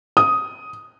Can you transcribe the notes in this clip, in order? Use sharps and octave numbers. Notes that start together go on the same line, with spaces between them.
D#6